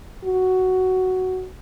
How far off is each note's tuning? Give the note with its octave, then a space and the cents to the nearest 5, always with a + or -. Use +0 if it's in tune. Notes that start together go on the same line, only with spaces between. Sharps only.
F#4 +5